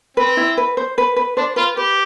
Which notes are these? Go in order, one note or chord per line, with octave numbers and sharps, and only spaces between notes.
C4 B4
E4
B4
C5
B4
B4
D4 C5
F4 B4
G4 B4